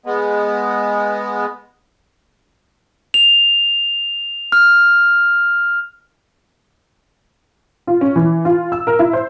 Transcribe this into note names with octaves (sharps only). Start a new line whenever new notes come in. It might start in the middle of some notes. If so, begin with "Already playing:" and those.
G#3 B3
F7
F6
F4
C#4
E3
F4
E6
A#4
E4
C5